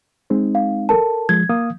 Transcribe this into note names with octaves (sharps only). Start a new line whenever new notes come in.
G#3 C4 D#4
F5
A4 A#4 A5
F3 G#3 G#6
A#3 F5 D#6